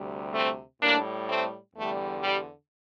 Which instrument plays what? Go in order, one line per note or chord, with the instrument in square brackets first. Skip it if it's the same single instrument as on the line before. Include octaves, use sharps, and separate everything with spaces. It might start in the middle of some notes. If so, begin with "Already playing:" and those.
Already playing: [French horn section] D2 C3 G3
A3 C4
A2 G3 A#3 D4
A3 C4
E2 D3 G3 A3
G3